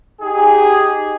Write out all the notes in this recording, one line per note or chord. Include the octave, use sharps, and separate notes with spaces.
D#4 G4 G#4